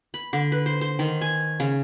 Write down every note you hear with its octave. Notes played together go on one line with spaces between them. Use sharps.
B5
D3
B4
C5
C5
D#3
G#5
C#3